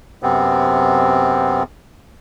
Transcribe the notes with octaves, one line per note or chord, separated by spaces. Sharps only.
F#2 C3 B3 C4